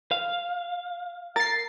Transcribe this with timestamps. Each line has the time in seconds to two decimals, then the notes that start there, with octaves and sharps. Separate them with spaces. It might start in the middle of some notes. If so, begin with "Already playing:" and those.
0.11 F5
1.36 A#4 A6 C7